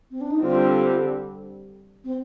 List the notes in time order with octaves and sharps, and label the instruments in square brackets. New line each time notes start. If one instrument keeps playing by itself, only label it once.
[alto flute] C4
D4
D#4
[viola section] D3 G3 C4 G4 [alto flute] F4
[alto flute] C4